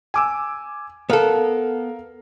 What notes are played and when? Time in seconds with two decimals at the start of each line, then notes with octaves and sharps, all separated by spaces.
0.14 G#5 D6 E6
1.10 B3 A4 A#4 F5